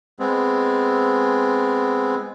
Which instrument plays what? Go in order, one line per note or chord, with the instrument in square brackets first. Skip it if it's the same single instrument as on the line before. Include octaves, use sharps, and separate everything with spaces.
[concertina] G#3 B3 C4